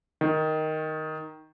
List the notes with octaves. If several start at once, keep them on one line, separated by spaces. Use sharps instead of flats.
D#3